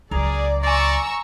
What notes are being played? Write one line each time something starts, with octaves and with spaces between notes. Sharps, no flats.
C#2 F#3 G#4 A#4 D5
D5 G#5 A#5 C6 C#6 E6